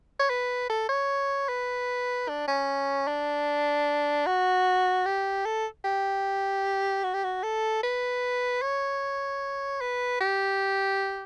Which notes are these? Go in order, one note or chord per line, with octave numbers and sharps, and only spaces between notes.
C#5
B4
A4
C#5
B4
D4
C#4
D4
F#4
G4
A4
G4
F#4
G4
F#4
A4
B4
C#5
B4
G4